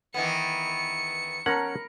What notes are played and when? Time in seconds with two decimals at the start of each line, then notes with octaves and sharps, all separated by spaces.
0.14 D#3 E3 B3 C#7
1.46 C#4 A#4 F#5 A#5 B5